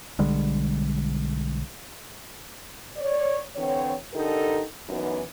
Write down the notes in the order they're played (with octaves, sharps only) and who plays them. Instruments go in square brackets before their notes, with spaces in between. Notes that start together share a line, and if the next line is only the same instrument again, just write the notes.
[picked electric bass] B1 D3 G3 G#3
[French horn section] C#5 D5
D3 E3 C4 C#5
D3 D#4 G4 A4 A#4
F#2 E3 B3 D#4 F#4